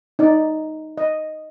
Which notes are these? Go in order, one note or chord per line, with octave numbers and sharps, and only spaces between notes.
D#4 D5
D#5